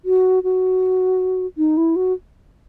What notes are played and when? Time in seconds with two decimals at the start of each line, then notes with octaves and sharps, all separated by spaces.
0.05 F#4
0.43 F#4
1.58 D#4
1.77 E4
1.96 F#4